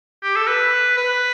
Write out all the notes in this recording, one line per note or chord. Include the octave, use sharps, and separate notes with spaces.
G4
A4
B4
B4